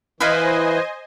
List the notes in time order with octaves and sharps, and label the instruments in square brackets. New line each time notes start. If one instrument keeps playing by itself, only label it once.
[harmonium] E3 [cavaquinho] E4 B4 F5 [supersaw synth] C5 D#5 G#5